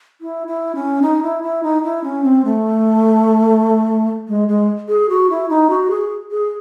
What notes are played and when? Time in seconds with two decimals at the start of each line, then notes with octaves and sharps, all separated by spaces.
0.21 E4
0.48 E4
0.75 C#4
1.02 D#4
1.23 E4
1.43 E4
1.63 D#4
1.84 E4
2.04 C#4
2.24 C4
2.45 A3
4.28 G#3
4.48 G#3
4.88 G#4
5.09 F#4
5.30 E4
5.50 D#4
5.70 F#4
5.90 G#4
6.31 G#4